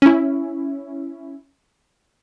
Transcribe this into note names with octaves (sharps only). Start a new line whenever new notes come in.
C#4 E4